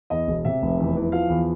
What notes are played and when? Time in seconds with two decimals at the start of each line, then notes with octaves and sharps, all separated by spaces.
0.10 E2 D#5
0.28 E1
0.45 C3 E5
0.62 F1
0.79 E2
0.96 E3
1.12 F3 F5
1.29 E2